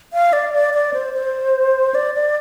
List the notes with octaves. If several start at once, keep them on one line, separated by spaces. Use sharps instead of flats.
F5
D5
D5
D5
C5
C5
D5
D5